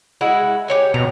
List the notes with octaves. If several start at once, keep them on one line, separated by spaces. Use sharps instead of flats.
G#3 E4 F#4
G4 C#5 G#5
B2 A#5